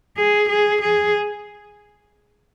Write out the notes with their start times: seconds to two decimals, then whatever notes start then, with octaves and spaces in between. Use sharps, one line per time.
0.17 G#4
0.49 G#4
0.82 G#4